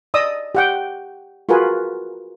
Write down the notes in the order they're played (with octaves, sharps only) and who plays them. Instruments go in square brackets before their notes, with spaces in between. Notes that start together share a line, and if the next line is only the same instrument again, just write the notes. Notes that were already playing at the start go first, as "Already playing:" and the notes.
[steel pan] D5 D#5 D#6 E6
G4 F#5 G5
F4 F#4 G#4 A#4 B4 G#5